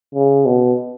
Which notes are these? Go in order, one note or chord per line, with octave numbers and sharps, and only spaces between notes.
C#3
B2